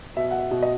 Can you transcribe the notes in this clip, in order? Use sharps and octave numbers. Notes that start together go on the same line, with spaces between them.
B2 E5
F#5
E5
B2
D#5